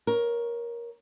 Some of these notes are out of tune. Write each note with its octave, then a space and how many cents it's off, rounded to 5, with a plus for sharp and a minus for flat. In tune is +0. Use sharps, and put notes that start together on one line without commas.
A#4 +15 C#5 +0